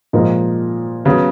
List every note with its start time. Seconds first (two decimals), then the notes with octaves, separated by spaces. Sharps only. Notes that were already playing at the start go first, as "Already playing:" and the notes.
0.13 A#2 F3 G#3 D#4 A#4
1.05 C#3 F#3 B3